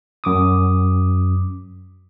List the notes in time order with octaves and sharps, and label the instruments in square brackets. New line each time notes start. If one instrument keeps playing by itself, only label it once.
[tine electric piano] F#2 D6 D#6